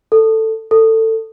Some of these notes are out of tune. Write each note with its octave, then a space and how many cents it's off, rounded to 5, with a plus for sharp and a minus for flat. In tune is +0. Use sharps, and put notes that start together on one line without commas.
A4 +10
A4 +20